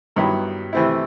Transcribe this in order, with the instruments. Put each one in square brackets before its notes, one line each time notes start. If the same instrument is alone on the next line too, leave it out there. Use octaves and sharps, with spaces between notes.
[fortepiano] G2 D#3 F#3 B3 E4
C3 E3 A3 C4 E4